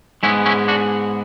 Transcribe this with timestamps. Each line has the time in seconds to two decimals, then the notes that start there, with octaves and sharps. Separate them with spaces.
0.23 G#2 G#3 B3 C#4 E4
0.46 C#4 E4
0.68 D4 F#4